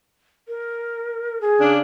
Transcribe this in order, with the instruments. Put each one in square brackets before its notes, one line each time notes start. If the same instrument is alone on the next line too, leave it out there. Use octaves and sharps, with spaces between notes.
[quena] A#4
G#4
[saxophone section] C#3 D4